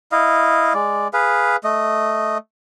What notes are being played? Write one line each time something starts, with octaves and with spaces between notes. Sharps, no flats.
E4 D#5 F5
G#3 D5
G#4 B4 F5
A3 D#5